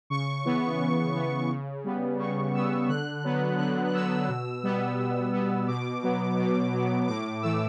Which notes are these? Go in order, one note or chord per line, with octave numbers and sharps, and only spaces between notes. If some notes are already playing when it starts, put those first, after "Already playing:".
C#3 C#6
E3 B3
C#3
E3 B3
C#3
G3 B3
C#3 C#6
G3 B3 E6
D3 F#6
F#3 B3
D3 F#6
F#6
F#3 B3 E6
B2
G3 B3
B2
G3 B3
B2 D6
F#3 B3
B2
F#3 B3
A2 D6
E3 A3 E6